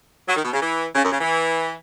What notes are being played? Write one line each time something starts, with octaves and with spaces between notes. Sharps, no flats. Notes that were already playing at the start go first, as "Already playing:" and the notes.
F#3
D#3
B2
C#3
E3
C#3
F#2
C#3
E3